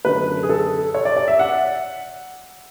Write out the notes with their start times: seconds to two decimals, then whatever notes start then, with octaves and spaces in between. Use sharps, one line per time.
0.05 F#2 D3 A3 B4
0.43 G#4
0.49 A4
0.94 C#5
1.05 D5
1.17 D5
1.28 E5
1.39 F#5